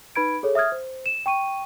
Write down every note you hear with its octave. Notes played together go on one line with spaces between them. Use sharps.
D#4 B4 B5 G#6 D7
G#4 A4 C#5
E5 D#6 F6 G#6
C5
E7
G5 C#6 D#7